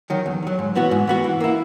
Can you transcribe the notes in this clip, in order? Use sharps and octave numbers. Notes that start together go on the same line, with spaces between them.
D#3 F#3
E2
D#3 F#3
G#2
E3 B3 F#4
G#2
E3 B3 F#4
E3
A#3 E4